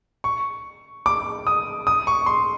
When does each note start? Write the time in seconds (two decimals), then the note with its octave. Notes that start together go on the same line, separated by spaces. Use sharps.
0.24 C#6
1.06 D6
1.47 D#6
1.87 D#6
2.07 C#6
2.26 C6